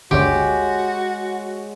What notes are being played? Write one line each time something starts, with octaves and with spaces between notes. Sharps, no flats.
G1 D2 D3 G#3 F#4 G4 C#5